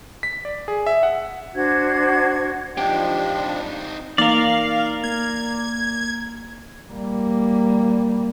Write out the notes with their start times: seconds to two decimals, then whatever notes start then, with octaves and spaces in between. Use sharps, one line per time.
0.23 B6
0.45 D5
0.68 G#4
0.87 E5
1.03 F#5
1.55 D4 F#4 C5 G#6
2.77 F3 C4 D4 D#4 G4
4.18 E3 A#3 D#4 A#4 D5 F5
5.04 A#3 G#6
6.92 G3 A#3